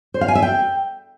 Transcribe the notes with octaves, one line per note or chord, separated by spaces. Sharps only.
C5
F5
G#5
E5
G5